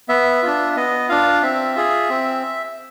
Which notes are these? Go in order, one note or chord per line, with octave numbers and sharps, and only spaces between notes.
B3 E5
D4 F4
B3 D#5
D4 F4 F5
C4 E5
F4 G#4
C4